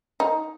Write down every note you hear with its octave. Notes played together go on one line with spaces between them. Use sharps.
D#4